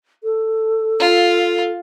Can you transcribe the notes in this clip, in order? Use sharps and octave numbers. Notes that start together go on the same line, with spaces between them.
A4
F4